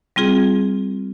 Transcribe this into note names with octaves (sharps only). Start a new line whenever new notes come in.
G3 C4 F4 G#4